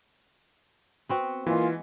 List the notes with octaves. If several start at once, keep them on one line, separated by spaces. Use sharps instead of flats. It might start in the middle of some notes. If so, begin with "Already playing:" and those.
B3 C4 F#4
E3 G#3 A#3 B3 F4